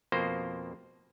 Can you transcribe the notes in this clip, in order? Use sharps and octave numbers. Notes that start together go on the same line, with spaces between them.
F2 B2 A#3 C5